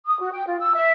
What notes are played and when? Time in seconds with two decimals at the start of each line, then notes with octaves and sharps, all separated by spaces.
0.06 D#6
0.20 F#4
0.33 G5
0.46 F4
0.60 E6
0.74 E5